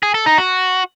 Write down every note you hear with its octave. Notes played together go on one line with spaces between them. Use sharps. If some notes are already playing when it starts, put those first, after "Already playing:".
G#4
A4
D#4
F#4